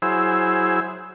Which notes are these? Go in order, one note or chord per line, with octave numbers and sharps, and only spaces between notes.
F#3 E4 G#4 C5 E6